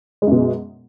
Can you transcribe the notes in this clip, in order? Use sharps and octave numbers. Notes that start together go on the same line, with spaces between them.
F#2 B2 G#3